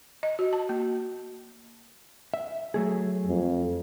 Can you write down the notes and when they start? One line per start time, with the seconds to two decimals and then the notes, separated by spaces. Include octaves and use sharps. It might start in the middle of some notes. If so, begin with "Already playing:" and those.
0.23 D#5
0.39 F#4
0.53 A5
0.69 A#3
2.34 E5
2.74 F#3 A3 G#4
3.27 F2